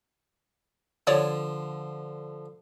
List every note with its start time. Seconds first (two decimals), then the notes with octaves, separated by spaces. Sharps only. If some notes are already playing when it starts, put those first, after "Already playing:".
1.07 D3 F3 C#5 D5 D#6